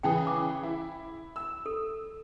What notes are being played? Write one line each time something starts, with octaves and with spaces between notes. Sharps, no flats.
C#3 E3 G#4 G5
D6
E4
E6
A4